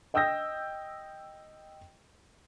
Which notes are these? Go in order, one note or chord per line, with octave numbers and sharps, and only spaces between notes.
D#5 G5 D#6 E6 G6 A#6